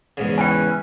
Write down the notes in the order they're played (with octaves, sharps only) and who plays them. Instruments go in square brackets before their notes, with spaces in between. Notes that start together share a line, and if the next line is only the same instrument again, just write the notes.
[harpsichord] E2 G#2 C#3
[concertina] C#4 E4 B4 [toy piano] G5 G#5